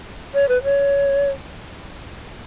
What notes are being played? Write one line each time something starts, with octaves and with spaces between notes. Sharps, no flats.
C#5
B4
C#5